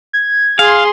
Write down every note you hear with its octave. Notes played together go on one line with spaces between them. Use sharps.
G#6
G#4 F5 C6